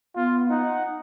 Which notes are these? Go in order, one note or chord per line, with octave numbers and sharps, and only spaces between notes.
B3 F4
D#4 F#5